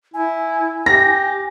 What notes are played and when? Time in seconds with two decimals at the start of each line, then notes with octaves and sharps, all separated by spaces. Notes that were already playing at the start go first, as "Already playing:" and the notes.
0.14 E4 G#5
0.86 G4 A#6